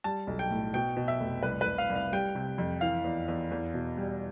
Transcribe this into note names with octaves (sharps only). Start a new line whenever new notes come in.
G3 A5
B1
G5
A2
B2 G5
B2
E5
F1
C2 B4
C2 B4
F5
C2
F5
G3 G5
C3
F2
E3 F5
E2
E2
E2
B2
G3